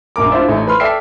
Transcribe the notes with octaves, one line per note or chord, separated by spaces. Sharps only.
A#1 F#2 A#4 D6
D4 E4 F4 C5 D5 E5
A1 A3 D#4
B4 B5 C6 F6
A4 D5 E5 G5 C7